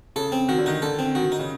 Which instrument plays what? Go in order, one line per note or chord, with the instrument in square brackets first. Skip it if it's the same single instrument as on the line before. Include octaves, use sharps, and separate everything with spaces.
[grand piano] C#3 [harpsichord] A4
[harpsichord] C4
[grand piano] D#3 [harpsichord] F#4
[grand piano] D3
[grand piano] D#3 [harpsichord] D#4
[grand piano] D3 [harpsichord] A4
[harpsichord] C4
[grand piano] D#3 [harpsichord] F#4
[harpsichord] D#4
[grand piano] C#3